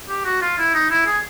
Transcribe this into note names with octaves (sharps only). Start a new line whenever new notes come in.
G4
F#4
F4
E4
D#4
E4
G#4